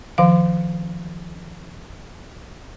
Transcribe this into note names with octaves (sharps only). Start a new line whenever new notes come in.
D#3 F3 F5